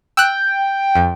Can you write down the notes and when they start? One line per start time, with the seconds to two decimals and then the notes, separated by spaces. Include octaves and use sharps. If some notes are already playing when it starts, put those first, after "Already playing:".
0.17 G5 E6 F#6
0.95 F2